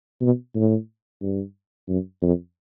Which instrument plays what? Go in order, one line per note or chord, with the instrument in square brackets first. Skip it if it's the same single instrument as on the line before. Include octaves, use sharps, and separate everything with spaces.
[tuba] B2
A2
G2
F#2
F2